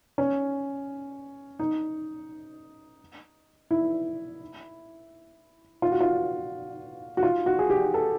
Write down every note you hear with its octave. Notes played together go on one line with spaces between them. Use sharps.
C#4
D#4
E4
F4
F#4
F4
F#4
F4
F#4
G#4
G4
A4